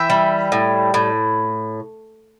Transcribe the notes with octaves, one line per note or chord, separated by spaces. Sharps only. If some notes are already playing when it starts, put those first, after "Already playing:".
Already playing: E3 E5 G5
G3
A2
A2